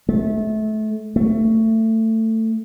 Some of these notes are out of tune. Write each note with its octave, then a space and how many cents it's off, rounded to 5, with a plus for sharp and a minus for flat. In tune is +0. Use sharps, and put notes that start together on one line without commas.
A3 -30
A3 +20